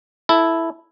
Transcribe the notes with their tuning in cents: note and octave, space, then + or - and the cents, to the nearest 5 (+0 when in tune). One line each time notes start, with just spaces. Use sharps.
E4 +0 A4 +0